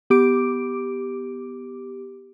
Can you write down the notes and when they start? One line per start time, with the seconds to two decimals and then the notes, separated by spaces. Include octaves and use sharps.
0.10 B3 G4 D6 D7